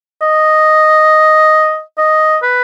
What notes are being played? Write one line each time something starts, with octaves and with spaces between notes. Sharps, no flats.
D#5
D#5
B4